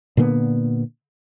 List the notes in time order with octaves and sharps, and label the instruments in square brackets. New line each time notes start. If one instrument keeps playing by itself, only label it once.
[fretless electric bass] A#2 D3 A#3 B3